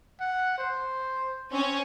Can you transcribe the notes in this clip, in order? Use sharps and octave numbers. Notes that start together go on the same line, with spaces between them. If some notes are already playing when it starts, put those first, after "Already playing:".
F#5
C5
C4 C#4